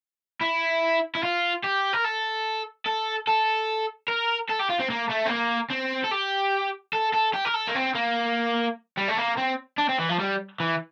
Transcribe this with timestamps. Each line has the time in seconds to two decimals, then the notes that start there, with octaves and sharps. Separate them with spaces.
0.41 E4
1.15 E4
1.23 F4
1.64 G4
1.93 A#4
2.04 A4
2.86 A4
3.27 A4
4.08 A#4
4.49 A4
4.59 G4
4.69 F4
4.79 C4
4.90 A#3
5.10 A3
5.27 C4
5.30 A#3
5.71 C4
6.04 A4
6.12 G4
6.93 A4
7.14 A4
7.34 G4
7.45 A#4
7.54 A4
7.68 A#3
7.75 C4
7.95 A#3
8.97 G3
9.08 A3
9.17 A#3
9.37 C4
9.78 D4
9.89 C4
9.99 E3
10.09 F3
10.19 G3
10.60 E3